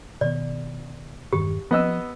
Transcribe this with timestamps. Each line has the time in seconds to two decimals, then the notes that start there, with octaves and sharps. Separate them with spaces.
0.21 B2 D#3 B3 D5
1.33 E1 G2 D#3 G4
1.71 F3 B3 D#5 E6